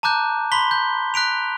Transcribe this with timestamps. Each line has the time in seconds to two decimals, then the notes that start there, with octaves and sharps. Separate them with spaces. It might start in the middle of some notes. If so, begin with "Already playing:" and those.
0.03 A5 A#5 D6 F#6 G6
0.52 B5 C6 B6 G7
0.71 G6
1.14 F#6 B6 D7 F7